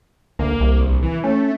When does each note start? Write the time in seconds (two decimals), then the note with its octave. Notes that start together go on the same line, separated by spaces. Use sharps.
0.39 D2 A#3
0.60 C2
0.80 A#1
1.03 E3
1.24 A3 C#4